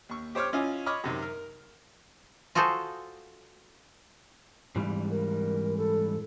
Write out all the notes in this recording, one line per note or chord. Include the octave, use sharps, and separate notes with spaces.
D#2 C#6
G4 C5 C#5 D6 F6
C#4 E4 F4 D#5 F5 G#5
C#5 D#5 B5 C#6 D6 F6
F#2 C3 D#3
A#4
F4 F#4 G#4 A4 C5
G#2 E3 G3
A#4
A4